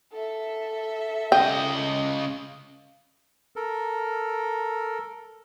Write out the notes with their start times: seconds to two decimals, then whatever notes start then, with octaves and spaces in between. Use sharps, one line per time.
0.13 A4 E5
1.32 C#3 D#5 G5
3.56 A4 A#4